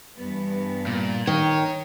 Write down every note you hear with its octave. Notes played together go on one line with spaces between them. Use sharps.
G2 E3 B3
A#2
D#3 C#5